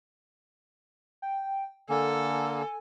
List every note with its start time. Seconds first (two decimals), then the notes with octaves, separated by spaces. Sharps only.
1.22 G5
1.89 D3 A#3 A4 G#5